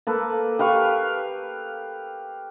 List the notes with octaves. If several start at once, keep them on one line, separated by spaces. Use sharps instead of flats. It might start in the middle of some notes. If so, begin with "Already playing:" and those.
A#3 A4 B4
G4 B4 F5 C#6